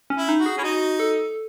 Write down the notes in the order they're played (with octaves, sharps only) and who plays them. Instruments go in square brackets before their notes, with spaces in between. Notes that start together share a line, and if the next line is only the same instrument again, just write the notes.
[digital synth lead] C#4
[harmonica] E4
[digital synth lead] D#4
[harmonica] F#4
[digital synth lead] G#4
[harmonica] C#4 [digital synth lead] E4
[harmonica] D#4 [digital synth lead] F#4
[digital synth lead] A4